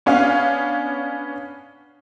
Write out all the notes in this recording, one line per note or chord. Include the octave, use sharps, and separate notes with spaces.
B3 C#4 D4 F5